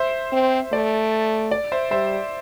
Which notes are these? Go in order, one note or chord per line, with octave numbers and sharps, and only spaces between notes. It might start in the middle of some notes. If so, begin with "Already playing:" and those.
Already playing: C5 E5
C4
A3 D5
D5
C5 E5
G3 C5 E5